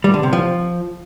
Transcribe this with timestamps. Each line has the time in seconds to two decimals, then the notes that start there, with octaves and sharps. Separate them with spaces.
0.04 G3
0.14 D3
0.23 C3
0.33 F3